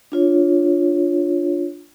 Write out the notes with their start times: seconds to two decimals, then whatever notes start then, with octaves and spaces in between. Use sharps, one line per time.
0.12 D4 F4 C#5